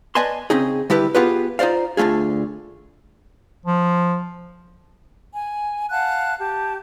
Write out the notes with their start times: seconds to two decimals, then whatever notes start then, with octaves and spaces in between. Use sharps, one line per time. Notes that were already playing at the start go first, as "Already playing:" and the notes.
0.15 B4 D5 D#5 G#5 A5 C6
0.50 C#3 C4 C#4 D#4 G#4
0.90 D3 G3 E4 G4 B4
1.15 B3 F4 G4 G#4 B4
1.59 D#4 F4 C5 D5 F5
1.97 D2 D3 A3 F4 G#4
3.66 F3
5.32 G#5
5.91 F5 F#5 A5 F#6
6.40 G4 A5